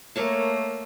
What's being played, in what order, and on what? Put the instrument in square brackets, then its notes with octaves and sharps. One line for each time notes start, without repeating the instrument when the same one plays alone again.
[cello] A3 A#3 [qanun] A#4 C#5 A5